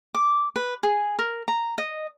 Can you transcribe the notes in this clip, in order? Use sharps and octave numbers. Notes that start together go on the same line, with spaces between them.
D6
B4
G#4
A#4
A#5
D#5